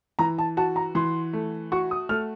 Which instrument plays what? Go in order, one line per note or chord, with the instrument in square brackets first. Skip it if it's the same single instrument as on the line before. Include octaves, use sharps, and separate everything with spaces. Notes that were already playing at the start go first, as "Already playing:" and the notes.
[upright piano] E3 [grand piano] A#5
[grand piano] A5
[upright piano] F#4 [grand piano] A5
[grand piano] A#5
[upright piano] E3 [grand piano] C6
[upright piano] A3
[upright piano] F#4 [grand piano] C#6
[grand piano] D#6
[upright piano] A3 [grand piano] F6